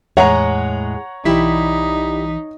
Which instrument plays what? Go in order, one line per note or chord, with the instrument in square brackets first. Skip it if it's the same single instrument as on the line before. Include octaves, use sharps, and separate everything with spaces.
[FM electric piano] E2 [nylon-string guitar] A2 G#3 G#4 [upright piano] C#5 F#5 A#5
[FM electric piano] B1 E3 B6 [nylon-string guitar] G3 E4 G4 [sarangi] D#4